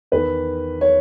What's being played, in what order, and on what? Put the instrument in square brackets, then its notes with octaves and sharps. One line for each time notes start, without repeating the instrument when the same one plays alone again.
[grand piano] E2 D#3 B4
C#5